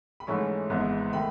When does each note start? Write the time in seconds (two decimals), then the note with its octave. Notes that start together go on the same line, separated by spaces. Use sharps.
0.20 B5
0.27 G#2 E3 A3 C#4 C#6
0.70 G#1 G#2 E3 B3
1.12 D#3 A3 B5